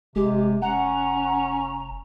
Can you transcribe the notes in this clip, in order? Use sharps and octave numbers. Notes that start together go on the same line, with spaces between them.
F1 C3 G#3 G4
C#4 F#5 A#5